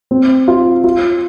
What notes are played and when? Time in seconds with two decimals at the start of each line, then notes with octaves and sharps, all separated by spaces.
0.11 C4
0.48 F4
0.84 F4